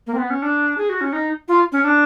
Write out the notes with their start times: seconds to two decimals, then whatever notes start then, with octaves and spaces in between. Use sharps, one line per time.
0.07 A#3
0.14 C4
0.18 B3
0.30 C#4
0.42 D4
0.78 G#4
0.89 F#4
1.01 C#4
1.13 D#4
1.48 F4
1.72 C#4
1.84 D4